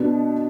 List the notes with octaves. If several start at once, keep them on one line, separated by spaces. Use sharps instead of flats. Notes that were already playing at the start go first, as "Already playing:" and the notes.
Already playing: B2 B3 D4